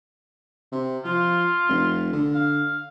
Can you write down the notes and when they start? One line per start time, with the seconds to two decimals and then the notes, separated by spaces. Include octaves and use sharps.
0.72 C3
1.05 F3 F4
1.69 F1
2.13 D3
2.34 F5